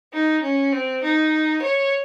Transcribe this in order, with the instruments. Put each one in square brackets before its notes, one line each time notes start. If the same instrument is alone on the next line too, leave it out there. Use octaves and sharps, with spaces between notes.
[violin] D#4
C#4
C4
D#4
C#5